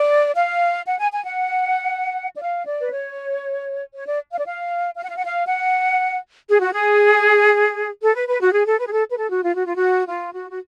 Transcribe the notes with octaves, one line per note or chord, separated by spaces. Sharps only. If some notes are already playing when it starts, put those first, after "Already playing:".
Already playing: D5
F5
F#5
G#5
G#5
F#5
D5
F5
D5
B4
C#5
C#5
D5
F5
D5
F5
F5
F#5
F5
F#5
F5
F#5
G#4
F#4
G#4
A4
B4
B4
F#4
G#4
A4
B4
G#4
A4
B4
A4
F#4
F4
F#4
F4
F#4
F4
F#4
F#4